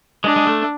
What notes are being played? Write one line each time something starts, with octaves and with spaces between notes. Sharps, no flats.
G#3 D4
G#3
A3